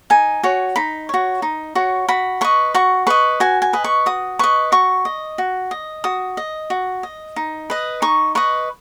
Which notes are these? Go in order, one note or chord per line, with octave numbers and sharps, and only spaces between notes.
D#4 G#5
F#4 C#5
D#4 B5
F#4 C#5
D#4
F#4 C#5
F#4 B5
B4 D#5 C#6
F#4 C#6
B4 D#5 C#6
F#4 G#5
G#5
B4 D#5
C#6
F#4 D#6
B4 D#5 C#6
F#4 C#6
D#5
F#4
D#5
F#4 D#6
D#5
F#4
D#5
D#4
B4 D#5
D#4 C#6
B4 D#5 C#6